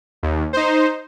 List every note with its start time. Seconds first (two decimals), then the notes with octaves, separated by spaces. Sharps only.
0.23 D#2
0.53 D#4 C5